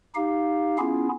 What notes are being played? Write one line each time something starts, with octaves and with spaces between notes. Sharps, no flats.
D#4 G4 F5
B3 C#4 E4 F4 G#4